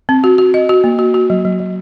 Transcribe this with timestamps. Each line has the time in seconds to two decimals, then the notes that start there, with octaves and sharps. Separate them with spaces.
0.09 C4
0.24 F#4
0.38 F#4
0.54 D#5
0.69 F#4
0.84 A#3
0.99 F#4
1.14 F#4
1.30 F#3
1.45 F#3
1.60 F#3